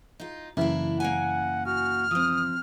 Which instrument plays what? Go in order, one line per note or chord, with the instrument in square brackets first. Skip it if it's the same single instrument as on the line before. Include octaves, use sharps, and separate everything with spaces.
[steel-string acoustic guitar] D#4 F4
[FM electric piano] F#2 C#3 E3 [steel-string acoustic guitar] A#3 D4 E4
[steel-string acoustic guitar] A#3 C#4 G#5 [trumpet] F#5
[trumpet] F#4 [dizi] F6
[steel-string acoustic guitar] F3 C4 [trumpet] D#6